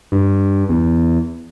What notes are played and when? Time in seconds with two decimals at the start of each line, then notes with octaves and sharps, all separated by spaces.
0.12 G2
0.69 E2